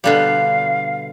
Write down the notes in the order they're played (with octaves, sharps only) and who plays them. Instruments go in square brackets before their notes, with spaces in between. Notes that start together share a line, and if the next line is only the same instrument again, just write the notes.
[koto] B2 D3 G3 [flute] F5